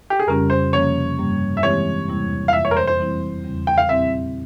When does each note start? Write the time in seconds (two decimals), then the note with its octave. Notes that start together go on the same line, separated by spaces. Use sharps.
0.10 G4
0.20 G#4
0.27 F2 C#3 G3 C#4 G4 A#4
0.50 C5
0.72 C3 F3 A#3 C#4 C#5
1.18 G2 G3 A#3
1.57 E5
1.62 E3 G#3 C4 E4 G4 C#5
2.08 E2 C3 G3 A#3 E4
2.48 F5
2.53 F2 E3 A#3 E4 E5
2.65 C#5
2.71 A#4
2.77 C5
2.87 C5
2.99 E3 G3 C4 E4
3.44 E2 C#3 G3 C4
3.67 G5
3.78 F5
3.89 A#2 G3 C4 E4 G4 E5